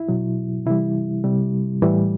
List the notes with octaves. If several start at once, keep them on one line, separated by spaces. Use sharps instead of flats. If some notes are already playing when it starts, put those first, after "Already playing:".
Already playing: E4
B2 F#3
C3 E3 G3 E4
C3 G3
A2 E3 G3